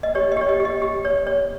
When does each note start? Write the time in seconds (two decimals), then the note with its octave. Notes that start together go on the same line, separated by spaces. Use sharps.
0.03 D#5
0.15 G4 C#5
0.32 D#5
0.37 G4 C#5
0.49 D#5
0.60 G4
0.65 D#5
0.82 G4
1.05 C#5
1.27 C#5